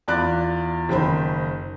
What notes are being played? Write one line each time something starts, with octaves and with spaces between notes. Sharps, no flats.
E2 F4 D5 B5 F#6
F#1 D#3 C5 B5